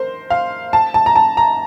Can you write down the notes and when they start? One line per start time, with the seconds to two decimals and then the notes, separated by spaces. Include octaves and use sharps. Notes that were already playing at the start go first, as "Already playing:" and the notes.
Already playing: A#4 C5
0.30 F5
0.73 A5
0.94 A5
1.06 A#5
1.16 A5
1.37 A#5